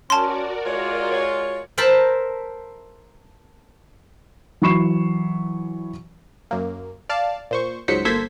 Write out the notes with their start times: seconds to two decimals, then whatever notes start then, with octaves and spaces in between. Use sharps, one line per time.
0.10 C#4 F#4 A#4 D5 A5 C6
0.66 G#3 F4 C#5
1.11 C#5
1.78 A#4 C5 E5 A5 B5
4.62 E3 F#3 B5 C#6 C7 E7
6.51 F#2 A#3
7.09 D5 F5 A5
7.51 A#2 C5 C#6
7.88 C#2 G#2 F#3 C5 B6 C#7
8.05 G1 A#3 A4 C5 G#6 B6